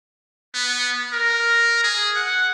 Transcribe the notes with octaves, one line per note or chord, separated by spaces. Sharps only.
B3
A#4
G#4
F#5